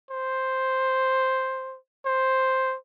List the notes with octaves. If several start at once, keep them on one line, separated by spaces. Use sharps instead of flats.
C5
C5